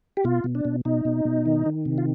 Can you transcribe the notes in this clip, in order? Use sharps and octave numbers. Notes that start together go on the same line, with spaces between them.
G4
B2 F4
B2
D4
B2
B2 D#4
B2
B2
D#3
D#3
C3
F4